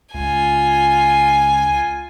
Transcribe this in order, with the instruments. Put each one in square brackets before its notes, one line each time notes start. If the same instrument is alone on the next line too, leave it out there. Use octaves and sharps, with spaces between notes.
[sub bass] C#2 [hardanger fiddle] F4 G#5